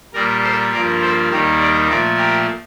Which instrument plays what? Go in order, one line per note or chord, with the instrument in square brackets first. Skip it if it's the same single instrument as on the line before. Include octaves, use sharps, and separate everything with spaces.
[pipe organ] A#2 G3 A#3 A#4 D5
A4 C5
G2 F3 A#3 A#4 D5
A4 C5
D#2 D#3 G3 A#3 G4 A#4
A#4 D5
A#2 F3 A3 A#4 D5
G4 A#4